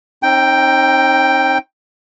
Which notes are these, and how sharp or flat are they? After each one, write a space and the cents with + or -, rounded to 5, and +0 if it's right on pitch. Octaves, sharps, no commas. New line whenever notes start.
C4 +40 D#4 +0 G5 +0